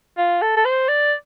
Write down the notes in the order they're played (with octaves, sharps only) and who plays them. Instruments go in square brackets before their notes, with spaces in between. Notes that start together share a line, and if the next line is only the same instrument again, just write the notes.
[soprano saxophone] F4
A4
A4
C5
D5